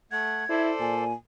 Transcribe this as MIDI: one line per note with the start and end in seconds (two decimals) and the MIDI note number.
0.12 0.44 57
0.12 0.44 78
0.12 0.62 92
0.49 0.73 64
0.49 1.04 69
0.49 1.04 72
0.49 1.04 74
0.80 1.13 46
0.80 1.13 80